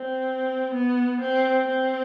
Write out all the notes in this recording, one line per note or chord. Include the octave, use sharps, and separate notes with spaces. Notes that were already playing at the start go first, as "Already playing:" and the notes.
Already playing: C4
B3
C4
C4